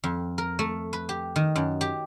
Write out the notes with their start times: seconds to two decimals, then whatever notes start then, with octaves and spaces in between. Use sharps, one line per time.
0.04 F2
0.38 A#4
0.59 A3
0.93 B4
1.09 G4
1.36 D#3
1.56 F#2
1.81 G4